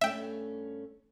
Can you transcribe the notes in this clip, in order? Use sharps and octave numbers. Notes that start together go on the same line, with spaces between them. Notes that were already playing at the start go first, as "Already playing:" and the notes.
G2 A3 C#4 E5 G5